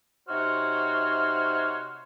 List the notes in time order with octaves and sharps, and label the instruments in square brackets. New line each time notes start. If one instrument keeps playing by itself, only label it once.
[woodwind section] C3 D#4 F#4 C5 C#5 F6